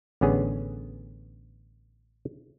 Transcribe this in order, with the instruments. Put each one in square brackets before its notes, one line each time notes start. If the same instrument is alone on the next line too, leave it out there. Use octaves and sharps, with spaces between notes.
[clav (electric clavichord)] A1 D3 B3 C#4 G#4